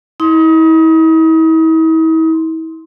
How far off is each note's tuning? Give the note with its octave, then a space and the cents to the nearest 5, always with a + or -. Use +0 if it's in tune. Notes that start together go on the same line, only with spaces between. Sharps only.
E4 -40 C6 +0 D#6 +30